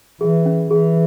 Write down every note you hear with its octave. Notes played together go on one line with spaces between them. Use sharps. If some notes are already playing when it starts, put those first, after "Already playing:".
E3 G#4
C#4
E3 G#4